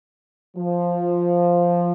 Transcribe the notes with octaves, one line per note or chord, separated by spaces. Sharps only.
F3